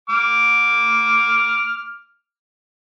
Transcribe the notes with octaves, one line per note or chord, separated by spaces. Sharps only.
D6 F6